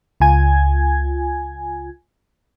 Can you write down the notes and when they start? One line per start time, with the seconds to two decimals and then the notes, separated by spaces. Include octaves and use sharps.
0.20 C#2 F4 G#5 G#6